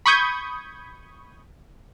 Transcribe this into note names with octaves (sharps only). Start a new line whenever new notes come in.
B5 C#6 D#6 G6 G#6